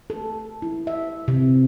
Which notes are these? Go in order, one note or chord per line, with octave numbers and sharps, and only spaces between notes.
A4
E4
E5
C3